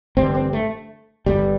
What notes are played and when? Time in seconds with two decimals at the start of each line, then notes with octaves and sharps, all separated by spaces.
0.17 A1 G2 D3 C4
0.35 C4
0.53 A3
1.26 G1 G2 D3 G3